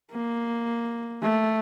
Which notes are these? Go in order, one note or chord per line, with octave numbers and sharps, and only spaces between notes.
A#3
A3